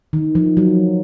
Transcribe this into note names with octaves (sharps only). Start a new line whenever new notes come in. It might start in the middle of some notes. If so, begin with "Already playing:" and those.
D#3
F3
F#3